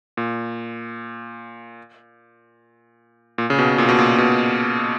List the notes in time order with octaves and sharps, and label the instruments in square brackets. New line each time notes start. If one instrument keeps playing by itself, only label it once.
[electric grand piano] A#2
A#2
C#3
B2
A#2
B2
A#2
B2